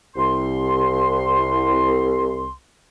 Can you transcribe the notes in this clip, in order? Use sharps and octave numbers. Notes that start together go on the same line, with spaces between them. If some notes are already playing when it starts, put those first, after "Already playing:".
C2 C6